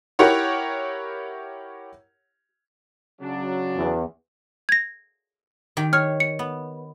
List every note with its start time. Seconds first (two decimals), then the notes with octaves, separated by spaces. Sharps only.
0.19 E4 G4 A#4 C#5 F#5
3.21 C#3 F#3 D4
3.77 E2
4.69 G#6 A#6
5.77 D#3 G4
5.93 C#5 F6
6.20 C#7
6.39 B3